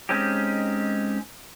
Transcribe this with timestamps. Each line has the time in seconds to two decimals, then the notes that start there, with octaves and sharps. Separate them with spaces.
0.09 G#3 C4 C#4 D#4 G4